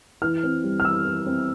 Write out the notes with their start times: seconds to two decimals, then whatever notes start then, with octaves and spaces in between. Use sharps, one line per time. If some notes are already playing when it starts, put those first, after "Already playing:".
0.22 E3 F6
0.43 C4
0.64 G3
0.80 F6
0.85 E3 E6
1.06 E3
1.26 C4